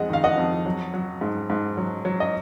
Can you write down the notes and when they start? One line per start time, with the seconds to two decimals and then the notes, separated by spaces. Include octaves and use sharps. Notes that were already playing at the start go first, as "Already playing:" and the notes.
Already playing: F2 G#3 D#5 F#5
0.10 D#3 F5
0.24 D#5 F#5
0.38 F2
0.65 F#3
0.94 F#3
1.21 G#2
1.50 G#2
1.77 F#3
2.05 F#3
2.20 D#5